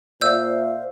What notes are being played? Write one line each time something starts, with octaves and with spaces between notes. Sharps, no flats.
A#2 C5 D5 E5 F5 E6 G6